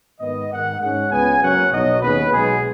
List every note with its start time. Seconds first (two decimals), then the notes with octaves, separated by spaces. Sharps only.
0.21 G#2 D#3 B3 D#5
0.51 G#2 D#3 G#3 F#5
0.80 G#2 G#3 C#4 F#5
1.10 C#2 C#3 B3 G#5
1.41 F#1 F#2 F#3 C#4 F#5
1.71 B1 B2 F#3 D#5
2.01 D#2 C#3 B3 B4
2.30 B1 B2 G#3 B3 G#4